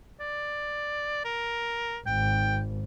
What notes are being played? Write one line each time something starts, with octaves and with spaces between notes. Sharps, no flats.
D5
A#4
G#1 G5